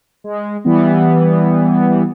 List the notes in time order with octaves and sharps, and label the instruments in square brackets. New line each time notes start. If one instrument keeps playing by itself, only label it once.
[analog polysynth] G#3
E3 G3 B3